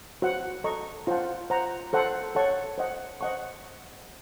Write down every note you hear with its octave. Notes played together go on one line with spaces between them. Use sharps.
F#4 C5 F#5
A4 D#5 A#5 C#6
F4 C5 F#5 A5
C5 F#5 A#5
A4 C5 F#5 A5 C6
A4 C#5 F#5 A5 C#6
C5 D#5 F#5
C5 D#5 F#5 A5 C#6